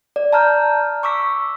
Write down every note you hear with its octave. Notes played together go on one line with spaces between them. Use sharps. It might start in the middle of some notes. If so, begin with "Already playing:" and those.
D5
A5 A#5 F6 G6
C#6 D6 E6 B6